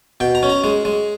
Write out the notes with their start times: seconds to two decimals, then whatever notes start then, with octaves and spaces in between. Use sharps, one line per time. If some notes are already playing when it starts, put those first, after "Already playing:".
0.20 B2 G5
0.35 A#5
0.43 C#4
0.50 A#5
0.64 G#3
0.85 G#3